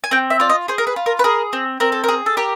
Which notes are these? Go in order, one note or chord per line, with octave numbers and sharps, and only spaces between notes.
G#5
C4 G5
E5
F4 D5
D#5
G#4 C5
A#4
B4
F4
A#4
B4
G#4 A#4
C4
C4 A#4
A4
G#4 A#4
A4
G4 A#4